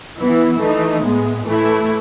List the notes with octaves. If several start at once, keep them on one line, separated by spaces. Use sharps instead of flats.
E3 B3 E4
E3 A3 D#4
A2 G#3 B3
A2 E3 A3 E4